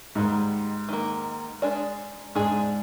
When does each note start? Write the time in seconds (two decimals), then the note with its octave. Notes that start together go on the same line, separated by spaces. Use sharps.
0.15 G#2 D#3 G3 A#3
0.89 D#3 G3 A#3
1.62 G#3 D4 G#4 D5
2.35 G#2 G#3 D4 G#4 D5